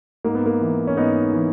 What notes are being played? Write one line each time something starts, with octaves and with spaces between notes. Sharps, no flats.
G#2 A#3
B3
A#3
E3
C#4
G#2 B3 D#4
E3